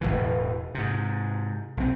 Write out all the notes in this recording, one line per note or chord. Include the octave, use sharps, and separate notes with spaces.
E1 C2 A2 E3
G#2 C3
B1 C4